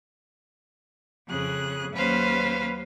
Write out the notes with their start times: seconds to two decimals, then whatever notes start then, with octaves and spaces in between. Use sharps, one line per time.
1.28 F2 C#3 G#4 F#6
1.93 D#2 F#3 C#4 B4 C5 F5